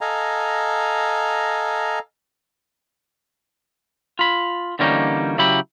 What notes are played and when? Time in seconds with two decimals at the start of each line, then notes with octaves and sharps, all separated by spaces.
0.01 A4 D#5 F5 G#5 A#5
4.19 F4 B5
4.79 D3 E3 G3 A#3 C#4 D#4
5.38 C#3 F#3 E4 G4 B5